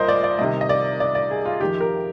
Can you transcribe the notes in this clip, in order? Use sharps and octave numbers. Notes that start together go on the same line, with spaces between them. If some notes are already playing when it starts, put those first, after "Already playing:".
Already playing: C2 A#2 A#4 C5 D#5
D5
D5
C2 C3 D#3 D#5
D#5
D5
D5
D5
G#4
F4
F2 D#3 G4
A#4